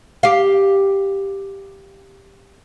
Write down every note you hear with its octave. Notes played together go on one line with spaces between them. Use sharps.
G4 F5